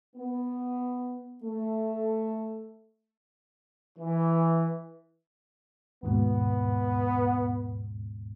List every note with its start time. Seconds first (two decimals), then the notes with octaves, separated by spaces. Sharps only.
0.16 B3
1.43 A3
3.99 E3
6.03 D#2 G#2 B2 B3